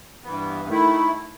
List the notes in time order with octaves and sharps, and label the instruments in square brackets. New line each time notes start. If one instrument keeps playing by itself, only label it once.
[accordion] G2 E3 B3
D#3 A3 E4